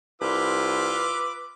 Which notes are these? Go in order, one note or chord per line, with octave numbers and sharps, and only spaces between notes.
C2 F4 B4 D6 E6